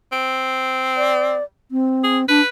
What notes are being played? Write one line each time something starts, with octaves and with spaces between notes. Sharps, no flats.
C4
D5
C4
G#4
D4 B4